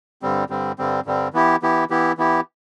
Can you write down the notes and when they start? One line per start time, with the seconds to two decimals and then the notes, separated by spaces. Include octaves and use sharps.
0.22 G2 D3 G3 C4
0.50 G2 D3 G3 C4
0.78 G2 D3 G3 C4
1.06 G2 D3 G3 C4
1.33 E3 B3 E4 G4
1.62 E3 B3 E4 G4
1.90 E3 B3 E4 G4
2.18 E3 B3 E4 G4